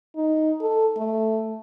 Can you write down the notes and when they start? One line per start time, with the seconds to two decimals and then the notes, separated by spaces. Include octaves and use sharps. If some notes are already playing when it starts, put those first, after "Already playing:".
0.16 D#4
0.61 A4
0.98 A3